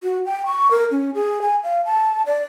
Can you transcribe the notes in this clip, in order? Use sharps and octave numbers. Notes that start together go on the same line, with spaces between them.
F#4
G5
C#6
A#4
C#4
G#4
G#5
F5
A5
D5